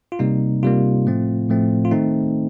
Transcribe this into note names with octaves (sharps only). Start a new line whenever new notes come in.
F4
C3 G3 A#3 D#4
C3 G3 A#3 F4
A2 F3 A3 C4
A2 F3 A3 C4
F4
D#3 A3 C4 D#4